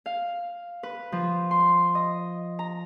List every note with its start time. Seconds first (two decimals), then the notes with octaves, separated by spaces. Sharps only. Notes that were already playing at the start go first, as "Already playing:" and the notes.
0.06 F5
0.83 B4
1.12 F3
1.51 C6
1.95 D#5
2.59 A#5